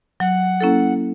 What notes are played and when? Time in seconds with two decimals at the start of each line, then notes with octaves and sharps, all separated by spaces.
0.20 F#3 F#5
0.61 A#3 C#4 E4 A4